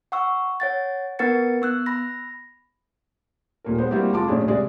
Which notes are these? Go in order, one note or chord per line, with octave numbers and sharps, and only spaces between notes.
F#5 C#6 E6
C#5 F#5 A6
B3 A#4 B4 F#5 A6 C#7
B3 E6 F#6
B5 A#6
D#1 A#2 A#4
G#3 B3 C5
G3 A#3 C4 E4 F#4 G4
F1 G#3 F4 A5 C6 D6
A#1 F#2 A2 C#4 D4 G#4
C2 G#3 G#4 D5